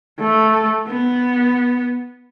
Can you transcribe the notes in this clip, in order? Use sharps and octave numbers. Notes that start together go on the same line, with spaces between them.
A3
B3